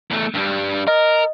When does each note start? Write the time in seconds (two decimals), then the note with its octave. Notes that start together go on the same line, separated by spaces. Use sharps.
0.11 E2 A3
0.34 G2 G3
0.88 A#4 D#5